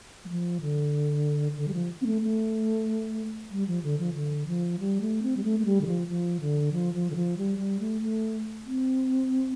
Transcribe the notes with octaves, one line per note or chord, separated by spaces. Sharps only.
G3
F3
D3
D3
G3
F3
C4
A3
A3
G3
F3
D3
F3
D3
F3
G3
A3
C4
G3
A3
A3
G3
D3
F3
F3
D3
F3
F3
D3
F3
G3
G3
A3
A3
C4